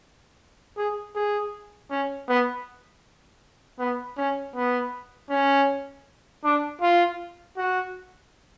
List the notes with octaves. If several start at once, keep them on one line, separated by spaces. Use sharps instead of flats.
G#4
G#4
C#4
B3
B3
C#4
B3
C#4
D4
F4
F#4